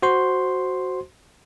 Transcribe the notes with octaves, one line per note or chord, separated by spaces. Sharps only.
F#4 C5 C6